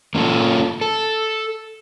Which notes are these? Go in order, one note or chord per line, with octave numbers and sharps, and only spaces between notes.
A#3 C#4 F4 A4
A4